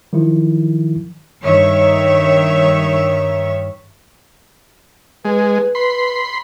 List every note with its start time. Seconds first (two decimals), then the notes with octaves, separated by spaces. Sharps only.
0.13 D#3 F3 F#3 E4
1.42 G2 D#3 C#5 E5
5.25 G#3 B4
5.75 B5 C6